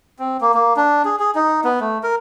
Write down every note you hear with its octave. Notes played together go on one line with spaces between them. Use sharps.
C4
A#3
A#3
D4
G#4
G#4
D#4
B3
A3
A#4